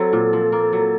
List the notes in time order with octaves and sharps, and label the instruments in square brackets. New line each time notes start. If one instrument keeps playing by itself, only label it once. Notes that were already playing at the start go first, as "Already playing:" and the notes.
Already playing: [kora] F#3 C4 [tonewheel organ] A4
[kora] A#2
F3
A#3
F#3